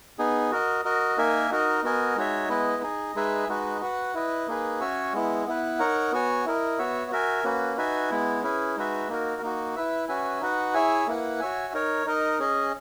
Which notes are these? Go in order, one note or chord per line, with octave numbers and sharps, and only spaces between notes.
B3 D#4 G#4
F#4 A#4 D#5
F#4 A#4 D#5
A#3 D#4 A#4 E5 G#5
D#4 F#4 A#4 D#5
B3 F#4 A#4 D#5 G#5
G#3 D#4 F#4 C#5 E5
G#3 B3 E4 B4 D#5
D#4 G#4 D#5
G#3 D#4 G#4 B4 E5
G#3 D#4 F#4 B4
F#4 B4 F#5
E4 B4 D#5
A#3 D#4 G#4 B4
C#4 F#4 C#5 E5 G#5
G#3 B3 E4
B3 E4 B4
D#4 A#4 C#5 F#5
B3 F#4 C#5 G#5
E4 A#4 D#5
B3 F#4 C#5 E5
F#4 A#4 E5 G#5
A#3 C#4 F#4 B4
D#4 F#4 B4 E5 G#5
G#3 B3 E4
C#4 E4 G#4 B4
G#3 D#4 F#4 B4 E5
A#3 D#4 F#4 A#4
A#3 D#4 F#4
E4 B4 E5
C#4 F#4 B4 E5 G#5
D#4 F#4 B4 F#5
E4 G#4 C#5 E5 G#5
A#3 E4 B4 F#5
F#4 C#5 E5 G#5
D#4 A#4 C#5
D#4 A#4 D#5
C#4 G#4 D#5